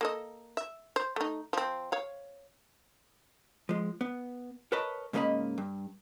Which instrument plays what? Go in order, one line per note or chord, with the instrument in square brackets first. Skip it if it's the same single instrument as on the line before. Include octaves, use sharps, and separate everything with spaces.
[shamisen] A#3 A4 D#5
E5
C5
A3 D#4
F3 C4
C#5 F5
[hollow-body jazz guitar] F3 G#3
B3
A#4 B4 C#5 D#5 A5 B5
G#2 C#3 A#3 A#4 D#5 B5
G2